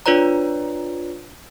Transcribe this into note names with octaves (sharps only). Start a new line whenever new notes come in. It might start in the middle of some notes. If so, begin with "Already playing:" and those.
D4 F4 B4 C#5 D5 A#5